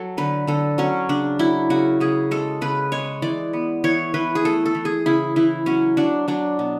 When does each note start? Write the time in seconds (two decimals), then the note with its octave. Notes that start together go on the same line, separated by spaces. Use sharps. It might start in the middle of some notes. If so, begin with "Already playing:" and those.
Already playing: F#3 A4
0.17 D3 B4
0.47 D3 A4
0.78 F#3 C#4
1.09 C#3 D4
1.39 F#3 E4
1.70 C#3 F#4
2.00 C#3 G#4
2.31 G#3 A4
2.61 C#3 B4
2.92 G#3 C#5
3.22 E3 D5
3.53 B3
3.84 E3 C#5
4.14 E3 B4
4.35 G#4
4.45 A3 A4
4.66 A4
4.75 E3
4.85 G#4
5.06 C#3 E4
5.36 E3 E4
5.66 F#3 C#4
5.97 F#3 D4
6.28 F#3 D4
6.59 B2